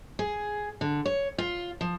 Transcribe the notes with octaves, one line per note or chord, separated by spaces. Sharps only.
G#4
D3
C#5
F4
F3